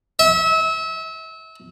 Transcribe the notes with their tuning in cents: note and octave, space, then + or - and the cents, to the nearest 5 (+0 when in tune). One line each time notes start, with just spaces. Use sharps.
E5 -30